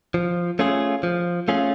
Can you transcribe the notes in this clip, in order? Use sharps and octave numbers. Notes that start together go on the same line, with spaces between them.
F3
A3 C#4 F4 G#4
F3
A3 C#4 F4 G#4